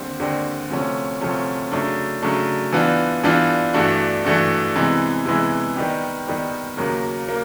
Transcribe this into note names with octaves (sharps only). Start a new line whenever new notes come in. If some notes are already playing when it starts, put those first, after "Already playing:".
Already playing: D#2 D3 G3 C4
D#2 D3 G3 C4
D2 C3 F3 A3 C#4
D2 C3 F3 A3 C#4
C#3 F#3 A3 D4
C#3 F#3 A3 D4
E3 G3 B3 D4 F4
E3 G3 B3 D4 F4
G2 E3 A3 D4 F#4
G2 E3 A3 D4 F#4
C3 E3 G#3 B3 E4
C3 E3 G#3 B3 E4
D#3 G3 B3 D#4 G4
D#3 G3 B3 D#4 G4
D#2 C#3 F#3 A#3
A#3